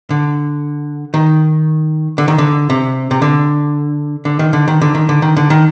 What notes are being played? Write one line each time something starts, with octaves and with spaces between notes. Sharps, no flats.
D3
D#3
D3
D#3
D3
C3
C3
D3
D3
D#3
D3
D#3
D3
D#3
D3
D#3
D3
D#3